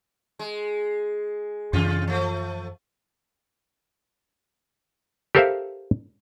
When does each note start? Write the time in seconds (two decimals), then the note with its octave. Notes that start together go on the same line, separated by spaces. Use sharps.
0.39 G#3
1.73 F#2 C3 E3 F4
2.07 F3 A3
5.35 G4 A4 A#4 C5 E5 F5